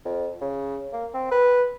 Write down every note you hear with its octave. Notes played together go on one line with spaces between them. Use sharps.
F2
C#3
A#3
C4
B4